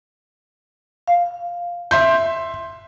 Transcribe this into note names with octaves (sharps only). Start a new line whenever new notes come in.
F5
E5 C6 G6